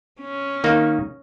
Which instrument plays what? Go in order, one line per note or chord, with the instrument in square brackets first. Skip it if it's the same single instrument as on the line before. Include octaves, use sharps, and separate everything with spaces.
[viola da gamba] C#4
[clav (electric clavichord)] D#3 A#3 D#4